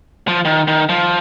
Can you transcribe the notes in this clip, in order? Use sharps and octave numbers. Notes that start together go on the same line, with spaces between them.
F3
D#3
D#3
F3